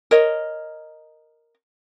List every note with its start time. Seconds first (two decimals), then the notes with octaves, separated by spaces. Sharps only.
0.11 A#4 C#5 D#5